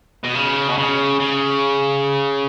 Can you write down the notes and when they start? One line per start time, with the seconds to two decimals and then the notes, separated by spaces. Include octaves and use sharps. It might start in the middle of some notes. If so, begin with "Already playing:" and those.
0.24 B2
0.35 C#3
0.68 B2
0.77 C#3
1.20 C#3